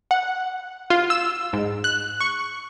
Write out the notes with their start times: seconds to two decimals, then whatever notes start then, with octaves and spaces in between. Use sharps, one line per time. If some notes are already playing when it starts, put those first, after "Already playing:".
0.11 F#5
0.90 F4
1.10 E6
1.53 G#2
1.84 F#6
2.20 C#6